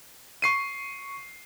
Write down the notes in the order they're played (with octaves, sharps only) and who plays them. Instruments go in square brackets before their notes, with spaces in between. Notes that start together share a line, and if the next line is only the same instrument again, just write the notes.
[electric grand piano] C#6 C7 D#7